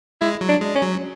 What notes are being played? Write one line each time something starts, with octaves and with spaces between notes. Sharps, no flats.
G#3 E4
F#3
D4
G#3
C#4
F#3